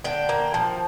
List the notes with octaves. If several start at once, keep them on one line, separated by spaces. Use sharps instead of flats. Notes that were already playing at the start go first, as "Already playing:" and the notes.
D3 G5
A#3
F3